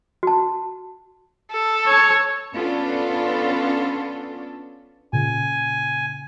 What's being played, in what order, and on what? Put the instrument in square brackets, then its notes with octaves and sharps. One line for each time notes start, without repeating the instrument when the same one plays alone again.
[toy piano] F#4 A5
[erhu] A4
[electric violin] C#5
[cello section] B3 C#4 D4 F4 A4
[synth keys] A#2 C#3 [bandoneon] G#5